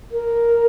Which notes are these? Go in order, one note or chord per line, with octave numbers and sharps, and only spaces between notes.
A#4